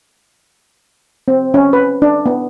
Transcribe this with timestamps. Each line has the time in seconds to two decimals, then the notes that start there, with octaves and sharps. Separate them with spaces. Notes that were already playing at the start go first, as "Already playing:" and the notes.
1.28 C4
1.54 C#4
1.73 B4
2.02 D4
2.26 B3